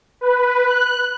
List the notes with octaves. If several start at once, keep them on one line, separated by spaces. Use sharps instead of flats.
B4
F#6